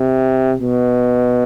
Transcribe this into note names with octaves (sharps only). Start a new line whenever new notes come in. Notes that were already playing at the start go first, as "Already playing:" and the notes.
Already playing: C3
B2